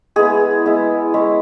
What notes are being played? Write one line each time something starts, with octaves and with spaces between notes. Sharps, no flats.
G#3 B3 E4 G#4
G#3 B3 E4
G#3 C#4 E4